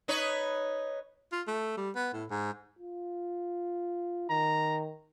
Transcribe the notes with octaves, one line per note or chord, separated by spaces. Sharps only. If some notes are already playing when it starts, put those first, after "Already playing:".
D#4 B4 C#5
F4
A3
G3
B3
A2
G#2
F4
D#3 A#5